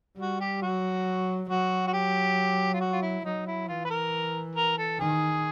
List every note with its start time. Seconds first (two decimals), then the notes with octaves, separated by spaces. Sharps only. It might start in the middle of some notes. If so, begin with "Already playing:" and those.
0.18 G3 F#4
0.40 G4
0.62 F#3 F#4
1.49 F#3 F#4
1.87 F#4
1.93 G4
2.74 F4
2.81 F#4
2.93 F4
3.02 E4
3.25 F#3 D#4
3.47 E4
3.68 E3 F4
3.85 B4
3.90 A#4
4.55 A#4
4.78 A4
4.99 D#3 G#4